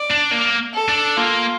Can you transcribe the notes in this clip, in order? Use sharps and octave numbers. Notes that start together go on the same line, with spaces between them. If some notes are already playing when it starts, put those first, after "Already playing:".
Already playing: D5
D4
A#3
A4
D4
A#3 F4